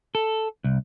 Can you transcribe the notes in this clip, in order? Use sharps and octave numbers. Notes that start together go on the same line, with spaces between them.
A4
C2